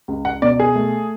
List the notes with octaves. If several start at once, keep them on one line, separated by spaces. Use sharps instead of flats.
C#2
F#5
B2 D5
G#4
A3